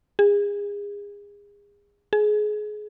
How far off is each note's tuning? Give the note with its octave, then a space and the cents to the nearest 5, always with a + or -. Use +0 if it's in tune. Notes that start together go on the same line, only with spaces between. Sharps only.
G#4 -30
G#4 +25